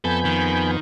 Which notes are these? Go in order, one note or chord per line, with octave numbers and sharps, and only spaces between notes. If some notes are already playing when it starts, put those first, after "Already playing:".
F2 B3 A4 G#5 B5 G6
D#3